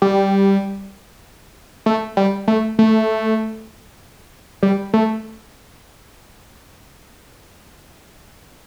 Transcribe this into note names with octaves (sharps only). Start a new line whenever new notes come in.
G3
A3
G3
A3
A3
G3
A3